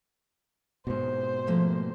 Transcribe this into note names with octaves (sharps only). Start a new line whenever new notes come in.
G#2 B2 C5
F3 A3 A#3